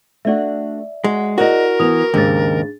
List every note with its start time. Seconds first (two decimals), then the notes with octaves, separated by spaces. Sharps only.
0.25 A3 D4 F#4 D5 E5
1.04 G#3 F#4
1.38 E4 F#4 G#4 A#4 D5 D#5
1.80 E3 B3 D#6 F7
2.14 D#2 G#2 C#3 D4 G#4 A6